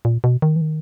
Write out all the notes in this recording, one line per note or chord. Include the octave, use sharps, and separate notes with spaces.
A#2
B2
D#3
E3
D#3